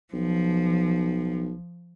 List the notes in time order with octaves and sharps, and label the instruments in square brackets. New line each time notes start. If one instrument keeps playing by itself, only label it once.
[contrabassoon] B1 [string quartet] F3